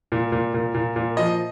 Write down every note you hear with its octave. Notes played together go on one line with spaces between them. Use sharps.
A#2
A#2
A#2
A#2
A#2
F3 D#5